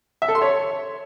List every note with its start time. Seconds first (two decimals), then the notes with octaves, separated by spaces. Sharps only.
0.22 E5
0.28 A4
0.35 C6
0.42 C#5